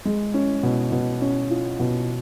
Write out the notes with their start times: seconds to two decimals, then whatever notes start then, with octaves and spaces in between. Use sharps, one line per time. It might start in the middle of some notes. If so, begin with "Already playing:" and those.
0.05 G#3
0.34 C#4
0.63 B2
0.92 B2
1.21 C#4
1.50 F4
1.79 B2